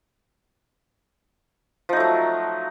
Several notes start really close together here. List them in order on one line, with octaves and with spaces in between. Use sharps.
F3 D#4 A3 F#3